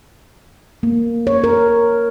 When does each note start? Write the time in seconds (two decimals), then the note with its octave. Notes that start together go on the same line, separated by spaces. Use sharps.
0.83 A#3
1.27 C#5
1.44 A#4